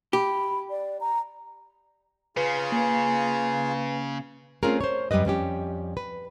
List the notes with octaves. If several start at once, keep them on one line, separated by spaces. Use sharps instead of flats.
G4 B5
D5
A#5
C#3 F4 G#4 B4
A#3 B4 G#5
A3 C4 C#4 F4 G#4 A#4
C5 C#5
F#2 G3 G4 B4 D#5
F2 G3 C#4 G4
B4